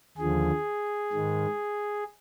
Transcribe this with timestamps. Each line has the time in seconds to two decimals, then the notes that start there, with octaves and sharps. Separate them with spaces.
0.18 D#2 D3 F3 G#4
1.13 G#2 D#3 G#3